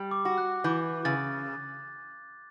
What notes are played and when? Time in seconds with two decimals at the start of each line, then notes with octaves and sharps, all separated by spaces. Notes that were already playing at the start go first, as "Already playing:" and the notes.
Already playing: G3
0.11 D6
0.25 F#4
0.38 F#6
0.64 E3 G6
1.05 C#3 A6